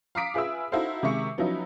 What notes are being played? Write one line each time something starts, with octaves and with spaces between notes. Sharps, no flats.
F5 A#5 D6 D#6 B6 D7
F4 G#4 B4 E5 E6
D#4 E4 F#4 A4 C5 F5
C3 D#3 G#3 E5 C#6 C#7
F3 F#3 B3 C#4 D#4 E4